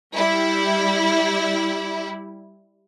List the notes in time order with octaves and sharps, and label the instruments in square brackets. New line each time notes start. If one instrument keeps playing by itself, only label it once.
[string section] G3 E4